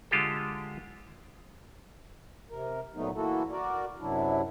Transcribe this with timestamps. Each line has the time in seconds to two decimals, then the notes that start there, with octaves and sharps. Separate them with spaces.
0.11 D3 G#3 F4 G4 A4
2.50 C3 A#4
2.95 A#2 F#3 A3 B3 D#4
3.15 E3 A#3 E4 F#4 A4
3.51 F#4 A#4 D5
4.00 F#2 C3 F#3 D4 E4